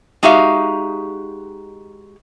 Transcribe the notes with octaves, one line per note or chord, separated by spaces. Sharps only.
G#3 D#4 F#4 G4 E5 F5